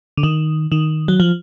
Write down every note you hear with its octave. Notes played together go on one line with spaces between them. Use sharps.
D3
D#3
D#3
F#3
F3